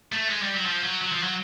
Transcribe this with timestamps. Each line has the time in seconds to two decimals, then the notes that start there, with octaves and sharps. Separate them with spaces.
0.12 A3
0.30 G#3
0.42 G3
0.54 F#3
0.66 F3
0.83 F#3
1.01 F#3
1.12 F3
1.22 F#3